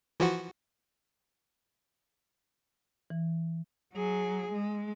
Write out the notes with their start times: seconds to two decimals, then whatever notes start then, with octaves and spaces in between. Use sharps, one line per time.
0.20 E3 F3 F#4
3.10 E3
3.93 F#3 G#4
4.52 G#3